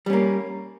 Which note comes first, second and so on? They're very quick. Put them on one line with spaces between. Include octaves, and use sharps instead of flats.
G3 C#4 A#3